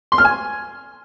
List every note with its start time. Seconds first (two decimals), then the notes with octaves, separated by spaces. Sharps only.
0.12 C6
0.18 F6
0.25 G#5